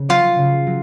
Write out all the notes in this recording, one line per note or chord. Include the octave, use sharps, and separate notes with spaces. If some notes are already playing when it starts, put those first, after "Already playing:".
Already playing: C#3
F#3 C#4 F4 F#4 C#5
C#3
F#3